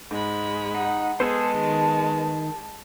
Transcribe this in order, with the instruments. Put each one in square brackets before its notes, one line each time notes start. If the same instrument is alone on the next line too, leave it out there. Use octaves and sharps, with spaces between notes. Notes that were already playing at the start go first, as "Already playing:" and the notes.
[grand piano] G#2 [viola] G#3 B5
[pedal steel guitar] D#4 [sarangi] F#5
[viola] G#3 [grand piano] B3 [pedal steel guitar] G#4 A4 C5 [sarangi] A5
[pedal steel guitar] D#3